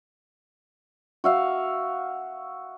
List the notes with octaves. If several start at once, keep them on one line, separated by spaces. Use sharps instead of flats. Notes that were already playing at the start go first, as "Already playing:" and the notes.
F#4 E5 F5